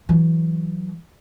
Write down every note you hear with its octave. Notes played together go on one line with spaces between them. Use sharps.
E3 F#3